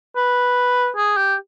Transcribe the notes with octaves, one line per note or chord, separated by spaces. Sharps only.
B4
G#4
G4